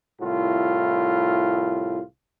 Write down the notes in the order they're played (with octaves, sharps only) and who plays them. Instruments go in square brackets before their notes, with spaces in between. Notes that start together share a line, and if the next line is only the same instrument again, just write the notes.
[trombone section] C2 A2 F4